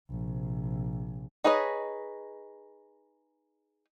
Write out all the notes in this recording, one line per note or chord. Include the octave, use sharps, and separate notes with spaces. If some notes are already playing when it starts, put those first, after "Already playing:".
A#1 C3
D#4 G#4 B4 C#5 D#5